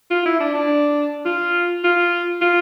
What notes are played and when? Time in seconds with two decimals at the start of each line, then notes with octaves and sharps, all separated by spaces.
0.11 F4
0.26 E4
0.40 D4
0.54 D4
1.25 F4
1.84 F4
2.41 F4